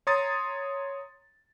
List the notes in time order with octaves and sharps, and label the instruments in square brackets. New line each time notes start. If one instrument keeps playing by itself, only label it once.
[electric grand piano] C#5 A#5 C6 D#6 A6